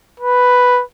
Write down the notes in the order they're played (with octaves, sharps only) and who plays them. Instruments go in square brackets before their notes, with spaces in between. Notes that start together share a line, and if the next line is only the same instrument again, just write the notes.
[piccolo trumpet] B4